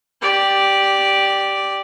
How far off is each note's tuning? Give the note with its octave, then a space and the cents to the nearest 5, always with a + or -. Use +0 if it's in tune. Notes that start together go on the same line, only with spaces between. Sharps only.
G4 -5 D5 +0